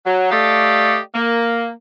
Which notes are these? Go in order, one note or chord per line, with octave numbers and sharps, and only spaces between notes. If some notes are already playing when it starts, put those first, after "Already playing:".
F#3
A3 G4 A4 D5 D#5 F5
A#3